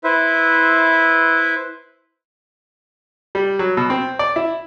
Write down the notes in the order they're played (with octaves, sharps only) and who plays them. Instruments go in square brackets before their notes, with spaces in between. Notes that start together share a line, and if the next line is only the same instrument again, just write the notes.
[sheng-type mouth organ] E4 B4 C5 E5
[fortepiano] G3
F#3
B2
C4
D5
E4